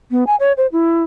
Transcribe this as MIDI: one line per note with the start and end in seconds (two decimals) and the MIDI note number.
0.11 0.24 59
0.27 0.36 80
0.40 0.52 73
0.57 0.67 72
0.72 1.04 64